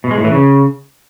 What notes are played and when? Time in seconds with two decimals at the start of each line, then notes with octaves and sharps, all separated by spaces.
0.04 B2
0.11 G#3
0.18 A2
0.25 E3
0.31 C#3